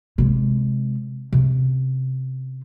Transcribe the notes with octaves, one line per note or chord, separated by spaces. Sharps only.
C3 G#3
C3 C#4